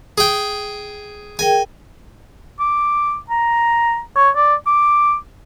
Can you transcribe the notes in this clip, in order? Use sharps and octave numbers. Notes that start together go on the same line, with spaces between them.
G#4 G5
G#4 A#4 G5 G#5
D6
A#5
C#5
D5
D6